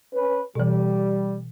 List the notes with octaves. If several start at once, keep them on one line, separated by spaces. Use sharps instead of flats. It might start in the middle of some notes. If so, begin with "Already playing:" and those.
C#4 B4
B2 E3 G3